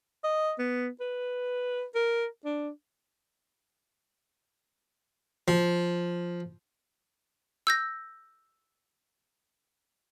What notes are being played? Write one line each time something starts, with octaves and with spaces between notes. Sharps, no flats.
D#5
B3
B4
A#4
D4
F3
E6 G6 A#6